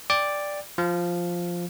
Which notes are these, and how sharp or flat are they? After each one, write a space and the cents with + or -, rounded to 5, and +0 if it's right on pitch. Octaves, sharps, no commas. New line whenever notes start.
D5 +0 G5 +15 D6 +0
F3 +0 F5 +0